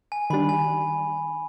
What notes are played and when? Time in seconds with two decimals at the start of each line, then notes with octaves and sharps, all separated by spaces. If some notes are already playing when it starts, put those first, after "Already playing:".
0.12 G#5
0.30 D#3 G3 D4 B5
0.49 G#5